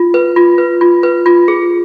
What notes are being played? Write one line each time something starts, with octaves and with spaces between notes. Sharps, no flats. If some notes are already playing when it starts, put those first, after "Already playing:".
Already playing: F4
B4
F4
B4
F4
B4
F4
G#4